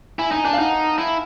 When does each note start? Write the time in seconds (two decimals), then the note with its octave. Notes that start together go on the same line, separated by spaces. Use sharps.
0.18 E4 G#5
0.31 D#4 G#5
0.45 D4 A5
0.53 F5
0.58 D#4 F#5
0.98 E4